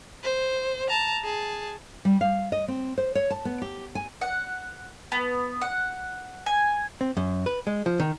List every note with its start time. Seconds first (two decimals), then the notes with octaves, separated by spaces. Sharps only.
0.23 C5
0.89 A5 A#5
1.24 G#4 A5
2.05 G3
2.21 F5
2.52 D#5
2.68 C4
2.98 C5
3.15 C#5
3.30 A5
3.45 B3
3.62 G4
3.95 G#5
4.21 F#5
5.12 B3
5.61 F#5
6.46 G#5
7.01 C4
7.17 F#2
7.46 B4
7.67 G#3
7.86 F3
8.00 D#3